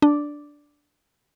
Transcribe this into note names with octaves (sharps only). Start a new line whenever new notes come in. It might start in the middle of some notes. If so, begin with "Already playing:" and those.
D4